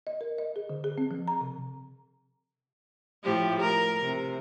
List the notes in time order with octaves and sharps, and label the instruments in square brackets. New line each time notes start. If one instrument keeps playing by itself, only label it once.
[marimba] D#5
A#4
D#5
G#4
D3
G#4
C4
F3
A#5
C3
[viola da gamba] A2 F3 G4
A#4
C3